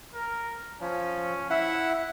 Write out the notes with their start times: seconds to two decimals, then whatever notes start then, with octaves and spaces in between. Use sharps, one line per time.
0.14 A#4
0.81 F3 C#4
1.50 E4 E5 F#5